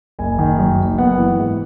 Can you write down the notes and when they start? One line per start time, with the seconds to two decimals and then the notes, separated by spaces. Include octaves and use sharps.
0.19 F#1 G#5
0.39 D#3
0.59 F#2
0.78 F#1
0.98 B3 F#5
1.18 E3
1.39 G#2